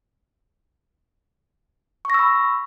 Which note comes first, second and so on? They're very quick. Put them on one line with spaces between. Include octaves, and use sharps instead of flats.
C#6 A#6 E6 B5